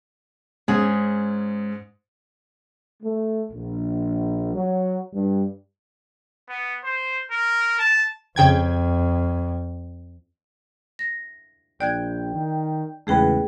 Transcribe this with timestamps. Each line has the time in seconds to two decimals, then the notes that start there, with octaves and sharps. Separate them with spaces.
0.68 G#2 C#4 G#4
3.03 A3
3.51 A#1
4.54 F#3
5.14 G2
6.49 B3
6.84 C5
7.31 A#4
7.79 A5
8.36 F2 C#3 G5 G#6
10.99 A#6
11.81 A#1 D5 G5 F#6 G#6
12.35 D#3
13.07 E2 G#2 C#3 A3 G#4 B4 G5